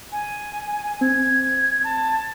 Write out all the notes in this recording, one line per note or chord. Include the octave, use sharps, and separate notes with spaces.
G#5
C4 G#6
A5